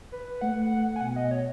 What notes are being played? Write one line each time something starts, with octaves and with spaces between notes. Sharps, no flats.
B4
A3 F#5
F#5
F#5
G#5
B2 F#5
D#5
C#5